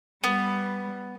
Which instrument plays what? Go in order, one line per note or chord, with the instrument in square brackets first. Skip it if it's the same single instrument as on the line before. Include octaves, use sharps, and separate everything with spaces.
[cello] G3 [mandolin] B3